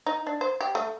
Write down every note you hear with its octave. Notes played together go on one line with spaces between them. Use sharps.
D#4
D4
C5
G4
A3